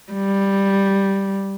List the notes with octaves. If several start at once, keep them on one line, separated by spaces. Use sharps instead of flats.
G3